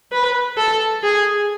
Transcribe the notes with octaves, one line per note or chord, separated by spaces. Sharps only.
B4
A4
G#4